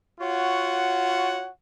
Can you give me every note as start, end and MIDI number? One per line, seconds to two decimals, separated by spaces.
0.20 1.48 65
0.20 1.48 66
0.20 1.48 73
0.20 1.48 78